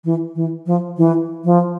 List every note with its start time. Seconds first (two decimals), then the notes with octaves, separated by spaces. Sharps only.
0.05 E3
0.35 E3
0.66 F3
0.98 E3
1.44 F3